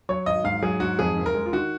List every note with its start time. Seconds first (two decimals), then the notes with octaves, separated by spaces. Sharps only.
0.09 F#3 C#5
0.26 G#1 D#5
0.44 G#2 F5
0.62 F#3 G#4
0.80 G#2 F#4
0.99 F2 G#4
1.17 F#1
1.26 A#4
1.34 G#3
1.46 F4
1.53 D#3 F#4